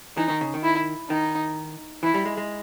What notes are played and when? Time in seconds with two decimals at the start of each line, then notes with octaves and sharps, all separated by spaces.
0.17 E3 D#4
0.30 D#3
0.41 C#3
0.54 D#3
0.63 E4
1.10 D#3 D#4
2.03 E3 E4
2.14 G3
2.25 G#3
2.37 G#3